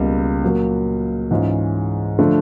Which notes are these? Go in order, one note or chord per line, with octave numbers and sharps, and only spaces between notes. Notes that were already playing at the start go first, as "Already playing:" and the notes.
Already playing: C#2 B2 G3 A#3
A#2 F#3 A#3
G#2 E3 G#3 C#4 F4
D3 F3 A3 D4